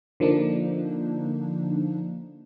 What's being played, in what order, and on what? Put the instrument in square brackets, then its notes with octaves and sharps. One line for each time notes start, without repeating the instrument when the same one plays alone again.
[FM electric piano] D3 F3 A#3 D4 D#4